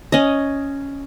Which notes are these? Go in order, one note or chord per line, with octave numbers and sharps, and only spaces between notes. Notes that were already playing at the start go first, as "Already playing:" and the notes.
C#4 D#5